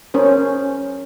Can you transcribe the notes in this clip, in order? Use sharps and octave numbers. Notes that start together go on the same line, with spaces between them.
C#4 A#4 C5